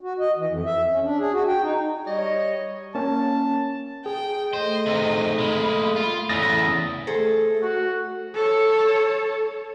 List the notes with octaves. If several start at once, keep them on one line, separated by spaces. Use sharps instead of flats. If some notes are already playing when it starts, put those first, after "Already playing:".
F#4
D#5
E3
F2
E5
C#4
D4
G#4
F#4
G5
D#4
G3 C#5 D#5
A#3 C#4 A5
G#4 G5
A3 C5 D#5
C3 D#3
G#3 A#3 B5
F4
E2 A2 C#3 E5 D#6 A6 A#6
A3 G#4 A4 C5
F#4
A4 C#5